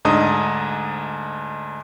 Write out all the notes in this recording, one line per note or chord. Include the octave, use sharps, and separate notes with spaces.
D2 G#2 D4 D#5 A#5 D#6